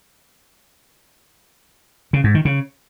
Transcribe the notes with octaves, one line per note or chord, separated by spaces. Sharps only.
C#3
G#2
D#3
C#3